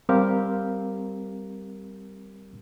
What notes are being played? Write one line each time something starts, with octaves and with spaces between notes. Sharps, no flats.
G3 C4 G4 A#4 F5